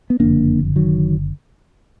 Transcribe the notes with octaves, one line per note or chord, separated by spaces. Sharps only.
B3
F#1 F2 D3 A#3 D4
D#3 F#3